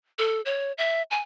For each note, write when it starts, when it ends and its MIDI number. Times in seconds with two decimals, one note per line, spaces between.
0.19 0.41 69
0.46 0.72 73
0.78 1.02 76
1.11 1.20 80